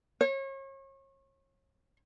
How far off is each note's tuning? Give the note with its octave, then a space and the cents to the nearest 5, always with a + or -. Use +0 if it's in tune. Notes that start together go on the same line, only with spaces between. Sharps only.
C#5 -35